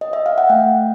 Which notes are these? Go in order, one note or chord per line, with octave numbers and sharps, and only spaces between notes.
D#5
E5
F5
F#5
A3 G5